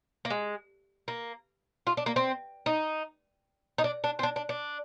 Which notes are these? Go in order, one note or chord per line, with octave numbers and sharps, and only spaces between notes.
A#3
G#3
A#3
F4
D4
A#3
C4
D#4
D#4
D4
D4
C4
D4
D4
D4